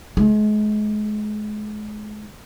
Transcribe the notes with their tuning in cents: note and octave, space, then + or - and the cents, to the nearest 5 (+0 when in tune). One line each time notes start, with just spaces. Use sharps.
G#3 +35